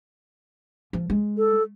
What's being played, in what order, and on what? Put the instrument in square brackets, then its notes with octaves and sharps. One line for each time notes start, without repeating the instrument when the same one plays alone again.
[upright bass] F3
G#3
[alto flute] A4